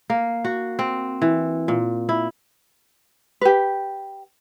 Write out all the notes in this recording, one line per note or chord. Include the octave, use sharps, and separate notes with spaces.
A#3
F#4
C4
E3
A#2
E4
G4 B4